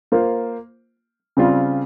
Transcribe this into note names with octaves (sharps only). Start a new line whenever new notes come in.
A#3 F4 C5
C#3 G3 C4 F4